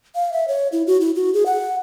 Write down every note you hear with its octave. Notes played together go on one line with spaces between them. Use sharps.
F5
E5
C#5
E4
F#4
E4
F#4
G#4
F#5